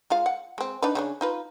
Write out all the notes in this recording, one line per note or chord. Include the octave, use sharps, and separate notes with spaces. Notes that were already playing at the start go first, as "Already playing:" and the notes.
G#3 F4 F5
F#5
G#3 C4
D4 D#4 B4
C#3 C#4 D4
D#4 F4 B4